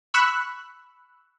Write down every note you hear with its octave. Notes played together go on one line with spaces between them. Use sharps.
B5 C#6 E6 F#6